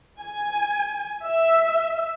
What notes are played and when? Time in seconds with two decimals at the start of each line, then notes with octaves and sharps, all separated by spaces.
0.19 G#5
1.25 E5